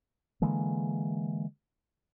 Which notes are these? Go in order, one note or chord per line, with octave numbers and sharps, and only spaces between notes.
D3 E3 G#3 A#3